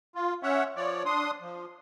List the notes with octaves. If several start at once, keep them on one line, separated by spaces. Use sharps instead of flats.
F4
C#4 C#5 E5 F#5
F3 C#5 D5
D4 C6 D#6
F3